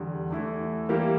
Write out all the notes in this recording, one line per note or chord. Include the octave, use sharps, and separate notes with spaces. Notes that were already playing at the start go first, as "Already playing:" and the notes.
Already playing: E2 D3 G3
E2 E3 A3 E4
E3 G3 A#3 E4 G4